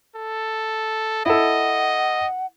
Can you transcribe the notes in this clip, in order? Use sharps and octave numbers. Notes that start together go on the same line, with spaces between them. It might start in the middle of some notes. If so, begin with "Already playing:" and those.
A4
E4 A4 D#5 F#5